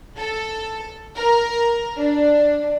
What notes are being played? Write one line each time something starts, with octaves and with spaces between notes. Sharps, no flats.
A4
A#4
D4